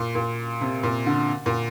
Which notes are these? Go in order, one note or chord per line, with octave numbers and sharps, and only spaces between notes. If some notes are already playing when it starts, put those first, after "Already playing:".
Already playing: A#2
A#2
C3
A#2
D3
A#2